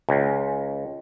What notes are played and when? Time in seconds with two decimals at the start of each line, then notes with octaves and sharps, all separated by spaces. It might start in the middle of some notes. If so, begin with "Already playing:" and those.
0.09 C#2